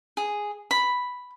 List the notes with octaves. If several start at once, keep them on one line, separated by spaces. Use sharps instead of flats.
G#4
B5